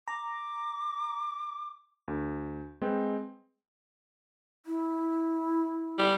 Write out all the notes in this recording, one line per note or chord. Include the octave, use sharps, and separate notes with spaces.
A#5 D6
D2
G#3 C4 B4 G5
E4
G3